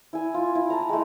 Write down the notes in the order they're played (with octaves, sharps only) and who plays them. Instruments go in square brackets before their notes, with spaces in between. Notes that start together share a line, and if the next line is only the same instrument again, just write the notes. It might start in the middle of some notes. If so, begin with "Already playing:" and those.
[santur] E4 G#5
F4
E4
A5 A#5
G#3 A3